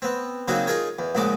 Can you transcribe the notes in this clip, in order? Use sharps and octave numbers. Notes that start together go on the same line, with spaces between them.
B3 C4
C#3 F#3 A#3 C4 D#4 F#4
D#4 F4 G#4 A#4 C#5
E2
A#1 G#2 C#3 D#4 F#4 D6